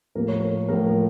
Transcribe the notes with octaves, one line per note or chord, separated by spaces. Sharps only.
A2 F3 A#3 A#4
C#5
A#4
A2 F3 A#3 A#4
A#4